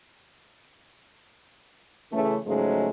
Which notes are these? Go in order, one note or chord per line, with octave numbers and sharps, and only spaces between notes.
C#3 E3 A3
G#2 C#3 F3 F#3 G#3 A3